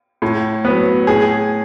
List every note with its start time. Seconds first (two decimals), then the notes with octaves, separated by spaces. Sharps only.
0.22 A2
0.65 F#3 B3
1.07 A2 G#4